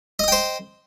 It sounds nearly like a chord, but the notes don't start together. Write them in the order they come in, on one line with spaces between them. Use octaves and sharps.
D#5 D#6 G5 C5